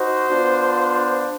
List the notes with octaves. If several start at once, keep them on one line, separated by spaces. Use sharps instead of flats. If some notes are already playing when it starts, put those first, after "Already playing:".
Already playing: D#4 F#4 C5
B3 D4 F4